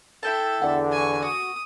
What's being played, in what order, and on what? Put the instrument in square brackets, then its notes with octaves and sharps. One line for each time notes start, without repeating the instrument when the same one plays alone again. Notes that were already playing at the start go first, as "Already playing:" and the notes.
[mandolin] E4 G5 A5 [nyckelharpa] A4 E5
[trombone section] E2 D3 [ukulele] D5 F#5
[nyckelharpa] G#5 C#6
[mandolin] F#4 [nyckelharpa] D#6